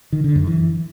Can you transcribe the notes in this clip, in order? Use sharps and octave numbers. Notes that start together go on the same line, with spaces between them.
D#3
D3
F#2
E3